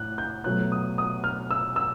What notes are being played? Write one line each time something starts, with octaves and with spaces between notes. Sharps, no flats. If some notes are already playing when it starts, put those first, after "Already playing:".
Already playing: A2 F#6
G6
B2 F#3 A3 F#6
D#6
D#6
F6
E6
E6